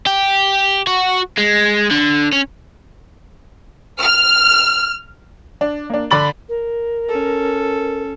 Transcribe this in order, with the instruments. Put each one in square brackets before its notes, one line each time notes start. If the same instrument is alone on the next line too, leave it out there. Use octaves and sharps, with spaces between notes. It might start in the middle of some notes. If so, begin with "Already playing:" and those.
[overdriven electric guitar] G4
F#4
G#3
D3
C#4
[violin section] F6
[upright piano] D4
A#3 D4
D3 D5 B5 A6 F#7
[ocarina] A#4
[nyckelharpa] C#4 A4